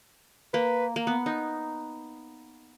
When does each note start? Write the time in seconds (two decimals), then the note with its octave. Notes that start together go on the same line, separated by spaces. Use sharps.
0.54 A#3 B4
0.96 A#3
1.07 B3
1.26 D#4